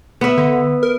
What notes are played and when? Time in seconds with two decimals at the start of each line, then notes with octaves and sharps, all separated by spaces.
0.21 B3 E5
0.38 D3
0.83 A#4